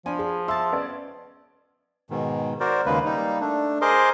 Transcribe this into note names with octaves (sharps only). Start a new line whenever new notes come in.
F3 D4 G#5 B5
G#4
E5 A5 C6
B3 C#4 D5
G#2 B2 D#3
F#4 A#4 C5 D5
D#2 C#3 G#3 A#3 B4
G3 A#3 D#4
A3 D4
G#4 A#4 C5 D#5 C6 D6